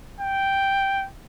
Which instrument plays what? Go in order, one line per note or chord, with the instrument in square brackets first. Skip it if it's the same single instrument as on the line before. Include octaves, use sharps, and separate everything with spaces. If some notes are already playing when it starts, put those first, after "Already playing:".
[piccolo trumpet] G5